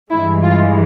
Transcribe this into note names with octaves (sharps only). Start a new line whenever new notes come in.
G2 E3 G#3 E4
F4